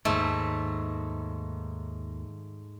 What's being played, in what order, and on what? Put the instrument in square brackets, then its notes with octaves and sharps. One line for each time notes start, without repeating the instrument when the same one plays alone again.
[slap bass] D#2 D#3 [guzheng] G#2 A3